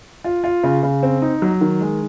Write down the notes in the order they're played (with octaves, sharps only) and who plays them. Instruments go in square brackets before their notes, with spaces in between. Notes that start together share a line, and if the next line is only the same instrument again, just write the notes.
[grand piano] F4
F4
C#3
C#3
C4
D#4
F#3
D#3
G#3